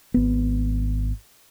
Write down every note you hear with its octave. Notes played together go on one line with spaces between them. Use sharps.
G#1 B3